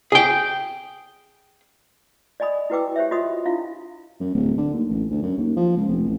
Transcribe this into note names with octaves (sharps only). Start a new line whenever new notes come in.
G#4 G5
D5 D#5 G#5 B5 D#6
E4 F#4 B4 G5 D6 E6
G4 C5 C#5 E5
F4 F#4 D#5 B5 C6 D#6
D4 E4 F4 F5
F#2
D1
D3
D#2
A1
D2
F#2
D#2
F3
C#2
F1
A1